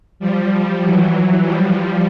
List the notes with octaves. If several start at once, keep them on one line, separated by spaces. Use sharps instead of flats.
F3 G3
F3 G3
E3 F#3
E3 F#3
F3 G3